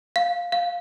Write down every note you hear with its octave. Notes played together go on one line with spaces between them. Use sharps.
F5
F5